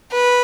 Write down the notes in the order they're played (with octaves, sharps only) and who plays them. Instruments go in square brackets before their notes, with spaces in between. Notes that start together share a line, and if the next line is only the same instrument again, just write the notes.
[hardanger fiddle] B4